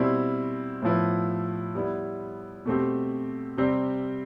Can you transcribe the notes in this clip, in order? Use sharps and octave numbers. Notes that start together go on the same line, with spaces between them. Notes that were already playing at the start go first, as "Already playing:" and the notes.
Already playing: B2 G3 C4 E4
A2 F3 B3 E4 B4
G3 B3 E4
B2 A3 C4 G4
C3 G3 C4 G4